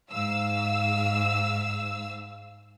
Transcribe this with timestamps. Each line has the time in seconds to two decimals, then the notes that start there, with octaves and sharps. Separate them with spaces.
0.10 G#2 F5 E6